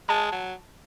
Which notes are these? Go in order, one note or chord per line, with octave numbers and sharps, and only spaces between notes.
G#3 A5
F#3